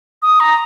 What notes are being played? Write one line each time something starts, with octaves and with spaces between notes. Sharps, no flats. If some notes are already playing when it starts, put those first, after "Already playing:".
D#6
A#5